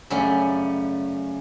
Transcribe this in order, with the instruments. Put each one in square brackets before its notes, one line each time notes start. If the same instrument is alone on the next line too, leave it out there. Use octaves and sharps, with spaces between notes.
[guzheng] F#2 C#3 G3 A3 C#4 F#5